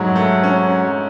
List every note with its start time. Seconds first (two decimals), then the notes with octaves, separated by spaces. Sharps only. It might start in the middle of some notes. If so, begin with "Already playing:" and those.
Already playing: G#2 F#3 A3 C#4
0.16 A3
0.43 C#4